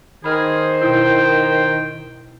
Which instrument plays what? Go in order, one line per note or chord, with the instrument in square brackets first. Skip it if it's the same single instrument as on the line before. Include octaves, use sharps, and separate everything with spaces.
[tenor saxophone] D#3 [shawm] G#4 [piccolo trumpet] C5 [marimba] B5 F6
[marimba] B2 E4 [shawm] G5